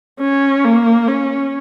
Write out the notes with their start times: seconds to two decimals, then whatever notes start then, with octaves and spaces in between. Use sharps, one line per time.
0.20 C#4
0.64 A#3
1.08 C#4